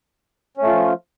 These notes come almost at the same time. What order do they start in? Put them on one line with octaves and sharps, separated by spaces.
C#4 A3 F4 F3